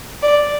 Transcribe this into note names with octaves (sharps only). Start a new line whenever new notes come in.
D5